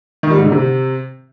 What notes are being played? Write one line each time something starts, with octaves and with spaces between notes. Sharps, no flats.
D#3
G3
G#2
D3
C3